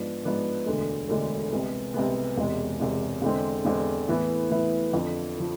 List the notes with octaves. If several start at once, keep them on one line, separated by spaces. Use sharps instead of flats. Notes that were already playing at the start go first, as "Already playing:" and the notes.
Already playing: G#2 F3 B3 D4
G#2 F3 B3 D4
E1 D2 D3 G#3
E1 D2 D3 G#3
C2 C3 G#3 B3
C2 C3 G#3 B3
E1 E2 C3 G#3
E1 E2 C3 G#3
E2 D3 G#3 C4
E2 D3 G#3 C4
A2 E3 B3 E4
A2 E3 B3 E4
F2 D3 F3
D3 F3